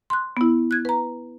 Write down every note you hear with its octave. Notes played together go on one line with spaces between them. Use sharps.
C6 F#6
B3 E4
F#6 G#6
B4 A#5